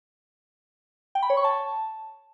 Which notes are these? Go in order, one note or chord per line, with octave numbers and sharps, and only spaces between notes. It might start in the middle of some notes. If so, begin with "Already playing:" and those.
G5
B5
C#5
C#6
A5